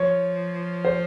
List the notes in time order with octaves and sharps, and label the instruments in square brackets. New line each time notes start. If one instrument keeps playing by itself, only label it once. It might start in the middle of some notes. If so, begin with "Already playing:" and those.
Already playing: [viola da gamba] F3 [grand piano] C#5
[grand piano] C5